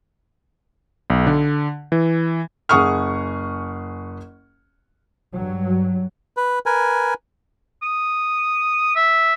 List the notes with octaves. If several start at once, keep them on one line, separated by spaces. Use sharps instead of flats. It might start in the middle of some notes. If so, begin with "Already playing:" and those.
B1
D3
E3
F#1 G#4 F#5 C#6 D#6 F6
G2 F#3
B4
A#4 B4 G#5
D#6
E5